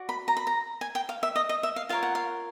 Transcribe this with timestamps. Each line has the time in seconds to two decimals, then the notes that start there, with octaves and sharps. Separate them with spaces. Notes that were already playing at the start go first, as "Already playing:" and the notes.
Already playing: F#4 D5
0.09 B5
0.28 A#5
0.37 B5
0.47 A#5
0.81 G#5
0.95 G5
1.09 F5
1.23 E5
1.36 D#5
1.49 D#5
1.63 E5
1.76 F5
1.89 F4 A#4 C#5 F5
2.03 F#5
2.15 F5